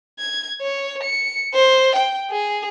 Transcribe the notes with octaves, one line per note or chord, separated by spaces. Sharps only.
G#6
C#5
C#7
C5
G5
G#4